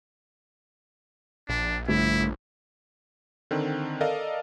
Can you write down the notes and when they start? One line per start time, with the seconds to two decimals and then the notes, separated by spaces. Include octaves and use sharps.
1.49 A#1 D4
1.88 G1 A3 E4
3.51 D3 D#3 C4
4.01 A4 A#4 D5 D#5 F5